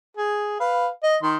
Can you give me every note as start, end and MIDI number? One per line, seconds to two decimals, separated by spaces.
0.17 0.56 68
0.60 0.88 71
0.60 0.88 77
1.03 1.17 75
1.23 1.37 51
1.23 1.37 84